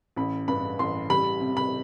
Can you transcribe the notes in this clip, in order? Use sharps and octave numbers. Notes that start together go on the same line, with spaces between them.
A1 B5
G2 B5
A1 C6
G3 B5
C3
B5